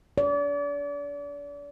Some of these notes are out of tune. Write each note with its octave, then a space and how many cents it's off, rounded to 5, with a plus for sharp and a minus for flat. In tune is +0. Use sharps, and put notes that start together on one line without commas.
D5 -35